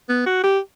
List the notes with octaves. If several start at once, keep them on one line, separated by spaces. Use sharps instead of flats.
B3
F#4
G4